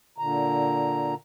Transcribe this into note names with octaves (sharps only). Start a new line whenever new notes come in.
A#2 D3 A#5